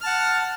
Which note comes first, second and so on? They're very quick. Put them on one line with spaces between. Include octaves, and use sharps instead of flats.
F6 A5 F#5